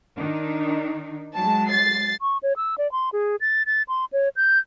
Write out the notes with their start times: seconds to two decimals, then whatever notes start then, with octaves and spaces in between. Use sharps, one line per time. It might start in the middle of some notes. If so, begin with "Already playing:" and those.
0.17 D#3 D4 D#4
1.34 F#3 G#3 A5
1.67 A6 C7
2.21 C#6
2.43 C#5
2.57 E6
2.78 D5
2.92 C6
3.13 G#4
3.41 A6
3.66 A6
3.88 C6
4.13 C#5
4.36 G6